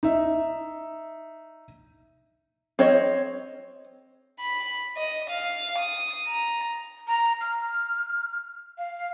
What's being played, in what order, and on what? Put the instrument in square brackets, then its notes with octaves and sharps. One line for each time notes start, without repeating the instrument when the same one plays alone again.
[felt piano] D#4 E5
[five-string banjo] C4 C#5 D#5
[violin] B5
D#5
F5
D#6
A#5
[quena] A#5
F6
F5